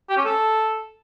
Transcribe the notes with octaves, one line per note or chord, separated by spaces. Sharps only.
G4
C#4
A4